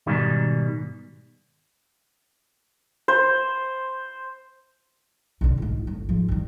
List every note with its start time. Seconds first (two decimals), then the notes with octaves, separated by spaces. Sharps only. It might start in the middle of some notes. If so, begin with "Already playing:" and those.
0.07 G#2 B2 D#3 G3
3.08 C5
5.41 B1 D3
5.58 G1 G#2
5.87 G1
6.09 G#1 F3
6.28 G2 D#3